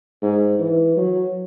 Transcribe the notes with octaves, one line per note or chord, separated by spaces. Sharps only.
G#2
E3
F#3